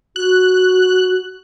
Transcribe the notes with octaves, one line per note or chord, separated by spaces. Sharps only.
F#4 F#6